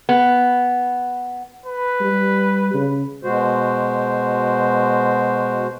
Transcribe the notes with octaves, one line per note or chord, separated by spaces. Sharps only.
B3
B4
G3
C#3
B2 G#3 F#4 C5